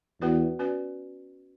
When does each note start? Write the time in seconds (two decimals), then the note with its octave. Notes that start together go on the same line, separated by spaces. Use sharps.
0.21 E2 B3 F#4 B4 D5
0.59 C#4 F#4 B4 D5